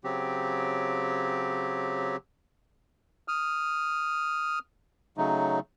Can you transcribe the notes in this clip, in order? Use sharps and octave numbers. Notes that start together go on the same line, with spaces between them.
C#3 F#3 C4 G4
D#6 F6
C#3 F#3 A3 D#4